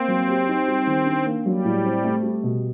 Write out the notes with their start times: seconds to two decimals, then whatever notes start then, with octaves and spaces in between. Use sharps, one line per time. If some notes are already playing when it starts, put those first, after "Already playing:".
Already playing: A#3 C4
0.08 F#3
0.28 G4
0.48 D#4
0.68 G3
0.87 D#3
1.06 D4
1.25 A#3
1.45 F#3 G3
1.65 A2
1.84 C4
2.04 A3
2.23 G3
2.43 B2